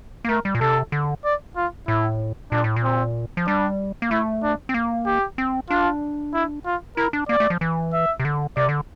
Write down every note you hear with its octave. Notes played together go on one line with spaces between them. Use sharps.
A#3
A3 A#4
G3
A#2
C3 A4
D3
D5
F4
A2 E4
A#2 D4
A2
A#2
C4
F3
G3 D4
A#3
A3 E4
D4
C4
A#3
G4
C4
D4 F4
E4
F4
E4 A#4
D4
A#3 D5
A3
F3
E3
E5
C3
D3
C3 D5
D3